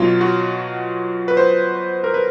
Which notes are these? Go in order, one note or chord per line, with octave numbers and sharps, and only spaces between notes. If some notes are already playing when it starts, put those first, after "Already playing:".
Already playing: B2 F#3 F4
F#4
B4
C5
A#4
B4